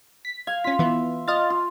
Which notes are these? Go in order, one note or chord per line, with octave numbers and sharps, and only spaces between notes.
B6
F5 G#6
C#4 F4 B6
E3 B3 E5
F4 D#5 F6 A6
F4